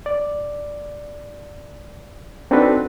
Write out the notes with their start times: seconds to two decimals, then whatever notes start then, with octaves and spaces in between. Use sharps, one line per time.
0.06 D5
2.51 C4 D4 D#4 F#4 A4 B4